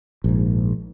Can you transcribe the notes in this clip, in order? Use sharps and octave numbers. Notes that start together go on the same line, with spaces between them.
A#1 G#2